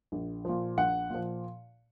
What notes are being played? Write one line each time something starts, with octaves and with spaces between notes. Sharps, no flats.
A#1
A#2 F3
A#1 F#5
A#2 F3